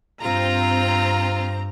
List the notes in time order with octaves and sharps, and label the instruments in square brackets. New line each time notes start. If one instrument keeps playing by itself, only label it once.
[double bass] G2 [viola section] C4 A#5 [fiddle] F4